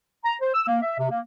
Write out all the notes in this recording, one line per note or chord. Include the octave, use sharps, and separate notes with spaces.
A#5
C5
E6
A#3
E5
C3
A#3